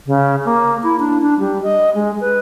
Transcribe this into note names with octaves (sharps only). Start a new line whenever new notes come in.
C#3
A#3
E4
D4
D4
G3
D#5
G#3
B4